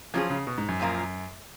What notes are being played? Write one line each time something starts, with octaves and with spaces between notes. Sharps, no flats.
F3 F#3 C#4 F4 G#4
C#3
B2
G#2
F#2
A#2 F3 A#3 F4 A#4